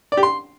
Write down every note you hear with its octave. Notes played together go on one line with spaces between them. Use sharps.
D5
G4
C6